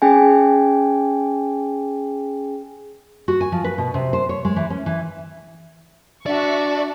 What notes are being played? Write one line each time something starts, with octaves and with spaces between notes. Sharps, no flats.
C#4 G#4 G5 G#5
F#4
G#5
F3
B4
B2
C3
C5
C#5
G#3
E3
C#4
E3
D4 F#4 D5 E5 C#6